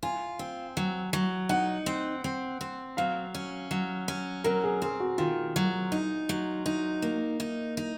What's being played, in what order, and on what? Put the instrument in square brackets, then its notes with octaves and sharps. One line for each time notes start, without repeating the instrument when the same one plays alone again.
[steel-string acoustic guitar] F4 [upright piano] G#5
[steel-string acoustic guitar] C4
F#3
F#3
[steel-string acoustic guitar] D#4 [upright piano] F#5
[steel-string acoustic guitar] C4
C4
C4
[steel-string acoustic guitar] F#3 [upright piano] F5
[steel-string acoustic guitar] C#4
F#3
C#4
[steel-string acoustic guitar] F#3 [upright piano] A#4
[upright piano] G#4
[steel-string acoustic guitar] C4 [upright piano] G#4
[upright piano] F#4
[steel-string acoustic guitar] D#3 [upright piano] F4
[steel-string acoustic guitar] F#3
D#4
F#3
D#4
A#3
D#4
D#4